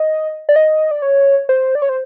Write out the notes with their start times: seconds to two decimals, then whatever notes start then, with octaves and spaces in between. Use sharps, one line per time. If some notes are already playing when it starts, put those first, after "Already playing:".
Already playing: D#5
0.49 D5
0.56 D#5
0.91 D5
1.02 C#5
1.49 C5
1.75 D5
1.82 C#5
1.89 C5